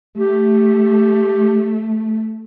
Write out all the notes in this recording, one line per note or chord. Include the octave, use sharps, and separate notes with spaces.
A3 G4